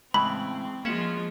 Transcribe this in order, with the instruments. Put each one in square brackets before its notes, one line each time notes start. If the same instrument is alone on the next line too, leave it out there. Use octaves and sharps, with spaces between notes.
[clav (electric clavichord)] A2 C#3 E3 [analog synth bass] G#3 [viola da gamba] C4 [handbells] B5
[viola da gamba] F3 G#3 F4 [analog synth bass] A#3 [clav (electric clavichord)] C#4 E5 F#5